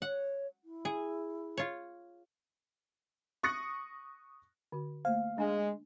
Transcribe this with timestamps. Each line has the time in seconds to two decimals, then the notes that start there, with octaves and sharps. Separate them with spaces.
0.02 C#5 F#5
0.64 E4
0.85 G#4
1.57 F4 C#5
3.43 C#6 D#6 F#6 A#6 C#7
4.72 D3 F#4
5.05 A3 A#3 C5 F5
5.38 G#3 D4 G#5